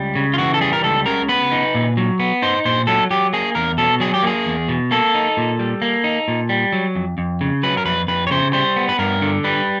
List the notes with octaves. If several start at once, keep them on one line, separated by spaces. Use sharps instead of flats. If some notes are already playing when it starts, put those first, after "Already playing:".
Already playing: C#2 G3
C#3
F4
E3 F#4
A4
G3 G#4
A#4
C#2 A4
C#3 A#4
B3 B4
D#4
A#2
F#3
B3
D#4 C5
A#2 C5
F#3 A4
F#3 G4
A#3 G#4
E2 A#4
B2 A4
F#3 G#4
G4
A#3 G#4
E2
B2
A#3 A4
D#4
A#2
G3
A#3
D#4
A#2
G3
F#3
F2
F2
C#3
F#3 B4
A#4
F2 B4
F2 B4
C#5
C#3 C5
G3 C5
B3
B4
G2 A#4
D3
G3 B4